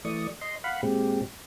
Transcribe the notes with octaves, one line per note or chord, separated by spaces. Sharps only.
E3 A3 D5 C#6 D#6
D#5 C6
F5 F#5 B5
A#2 G#3 C4 G4